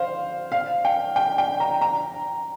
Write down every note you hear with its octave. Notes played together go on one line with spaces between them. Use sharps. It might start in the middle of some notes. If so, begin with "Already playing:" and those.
Already playing: C5 F5
F5
G5
G5
G5
A#5
A#5